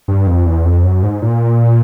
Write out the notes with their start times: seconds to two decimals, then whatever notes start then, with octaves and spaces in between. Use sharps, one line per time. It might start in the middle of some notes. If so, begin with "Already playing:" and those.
0.08 G2
0.27 F2
0.46 E2
0.65 F2
0.84 F#2
1.03 G#2
1.22 A#2